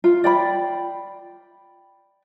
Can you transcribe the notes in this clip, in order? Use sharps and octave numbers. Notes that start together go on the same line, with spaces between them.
F4
D5 G5 B5